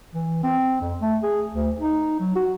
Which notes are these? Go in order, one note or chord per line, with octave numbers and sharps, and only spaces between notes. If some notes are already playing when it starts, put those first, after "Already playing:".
E3
C4
F2
A3
G#4
D2
D#4
F#3
F#4